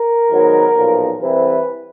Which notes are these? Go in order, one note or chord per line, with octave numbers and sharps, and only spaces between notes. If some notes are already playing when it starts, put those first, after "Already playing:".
Already playing: A#4
G#2 D#3 F#3 B3
B1 A#2 F3
C2 C3 E3 B4